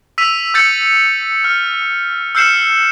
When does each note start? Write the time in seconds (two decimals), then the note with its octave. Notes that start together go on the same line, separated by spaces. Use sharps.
0.18 E6 B6 D#7 F7
0.54 E6 G6 A6 C#7
1.44 F6
2.35 E6 F6 G6 C7 C#7 E7